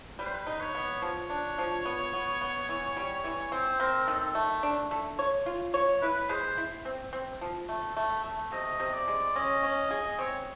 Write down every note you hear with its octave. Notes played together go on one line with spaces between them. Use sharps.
G3 B4
C5
B4
D#4
C#5
B3
F3 C#5
D4
F3
B3
B3
B3
E3
G3
E3
C4 C5
C4 A#4
D#3 A4
A3
D4
A3
C#5
F4
C#5
E4 B4
G#3 C5
E4
C4
C4
F3
A3
A3
A3
C3 D#5
C3
D5
G#3
C#4 D#5
C#4
G#4
C4 C#5